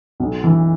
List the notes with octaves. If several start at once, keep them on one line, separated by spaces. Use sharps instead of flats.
B1
E3